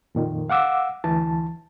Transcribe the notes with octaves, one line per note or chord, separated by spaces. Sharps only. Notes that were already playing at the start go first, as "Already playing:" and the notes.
F2 A#2 D#3
F5 F#5 D6 E6
D2 E3 A5